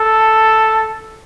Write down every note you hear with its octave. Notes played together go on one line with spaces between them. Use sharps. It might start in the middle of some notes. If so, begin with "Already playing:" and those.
Already playing: A4